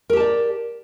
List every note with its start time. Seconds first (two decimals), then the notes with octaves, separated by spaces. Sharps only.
0.10 A#4
0.13 G4
0.17 A5
0.20 D5